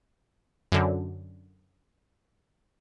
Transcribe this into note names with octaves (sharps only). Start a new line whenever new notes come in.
F#2 D3